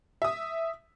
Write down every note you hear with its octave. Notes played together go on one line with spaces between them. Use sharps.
E5 D#6